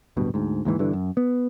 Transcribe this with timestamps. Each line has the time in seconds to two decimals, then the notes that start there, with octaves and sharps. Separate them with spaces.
0.17 D1 G2 B2
0.34 D2 G#2
0.65 D#2 G#2 B2 E3
0.79 G1 G2 D3 E3
0.93 F#2
1.17 B3